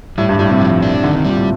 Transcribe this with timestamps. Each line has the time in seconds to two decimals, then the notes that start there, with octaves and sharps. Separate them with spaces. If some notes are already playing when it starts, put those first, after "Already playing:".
0.18 A2 G3
0.29 G2
0.39 A2 G3
0.50 C3
0.61 F3
0.82 D4
1.04 D3 D#3
1.15 C3
1.25 A#2 G3
1.36 A2